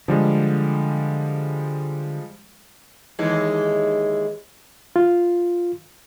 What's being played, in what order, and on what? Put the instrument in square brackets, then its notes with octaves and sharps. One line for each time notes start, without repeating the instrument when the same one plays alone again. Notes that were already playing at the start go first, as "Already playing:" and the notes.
[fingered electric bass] D3 [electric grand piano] F3 G3 G#3
[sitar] D#2 E3 G#3
[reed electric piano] F4